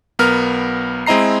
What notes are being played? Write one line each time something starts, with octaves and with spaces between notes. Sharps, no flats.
B1 B3 A#4 F6
G#3 C4 E4 D#5 A#5 C7